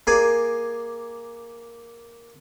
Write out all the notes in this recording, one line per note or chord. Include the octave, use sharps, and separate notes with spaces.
A#3 G#4 D5 G#5